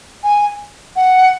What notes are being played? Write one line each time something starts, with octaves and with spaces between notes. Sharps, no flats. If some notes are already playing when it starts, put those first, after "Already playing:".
G#5
F#5